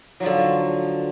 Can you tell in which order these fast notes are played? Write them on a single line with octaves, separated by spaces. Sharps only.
F#3 F3 D3